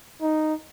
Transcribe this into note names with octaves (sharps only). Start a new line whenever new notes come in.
D#4